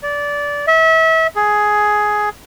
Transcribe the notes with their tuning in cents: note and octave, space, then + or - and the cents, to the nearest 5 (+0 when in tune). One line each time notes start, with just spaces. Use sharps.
D5 -20
E5 -30
G#4 +10